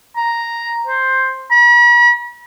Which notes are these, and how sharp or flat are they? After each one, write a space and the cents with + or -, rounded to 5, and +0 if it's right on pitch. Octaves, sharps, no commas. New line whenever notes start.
A#5 +0
C5 +5
B5 -45